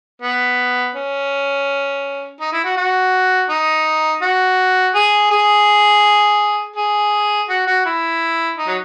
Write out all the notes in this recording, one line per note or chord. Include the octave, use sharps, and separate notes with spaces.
B3
C#4
D#4
E4
F#4
F#4
D#4
F#4
G#4
G#4
G#4
F#4
F#4
E4
D#4
F#3